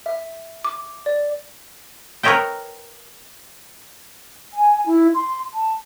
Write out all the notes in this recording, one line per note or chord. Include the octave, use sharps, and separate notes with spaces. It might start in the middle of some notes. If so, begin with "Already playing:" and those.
E5
D6
D5
A#4 B4 C#5 D#5 E5 G5
G#5
E4
C6
A5